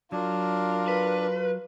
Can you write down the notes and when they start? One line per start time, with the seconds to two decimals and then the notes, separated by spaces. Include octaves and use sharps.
0.12 F#3 D4 F4 A#4
0.88 B4